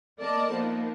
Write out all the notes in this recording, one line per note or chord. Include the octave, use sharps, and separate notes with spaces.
A#3 A#4 D5 D#5 A5
F3 A#3 B3 D#4